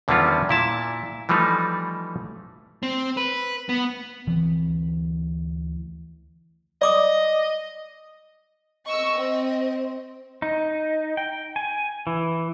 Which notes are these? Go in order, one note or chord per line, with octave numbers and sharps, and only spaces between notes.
E2 D3 D#3 G3 C#4 F4
A#2 E4 A5
E3 F3 G3 A3 D#4
C4
B4
B3
D2 E3 C4
D5 D#5 D6 D#6
D#5 C#6 E6
C4
D#4
G5
G#5
E3